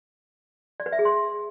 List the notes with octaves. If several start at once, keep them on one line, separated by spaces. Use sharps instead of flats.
D5
B4
E5
G#4
C6